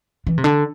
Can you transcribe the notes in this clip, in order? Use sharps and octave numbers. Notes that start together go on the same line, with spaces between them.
E3
C3
D3